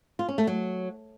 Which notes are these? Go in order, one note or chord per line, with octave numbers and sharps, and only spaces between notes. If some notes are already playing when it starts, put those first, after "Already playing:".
F4
C#4
A3
F#3